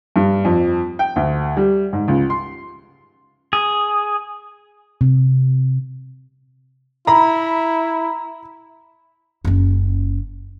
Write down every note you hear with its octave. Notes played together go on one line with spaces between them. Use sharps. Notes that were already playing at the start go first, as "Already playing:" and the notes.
G2
F2
G5
D2
G3
G#2
C#2
C6
G#4
C3
E4 A#5 B5
F#1 C#4